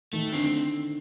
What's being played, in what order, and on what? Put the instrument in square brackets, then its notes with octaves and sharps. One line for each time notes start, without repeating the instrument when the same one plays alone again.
[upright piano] D#3 [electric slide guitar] A3
[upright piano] D3 [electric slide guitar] C4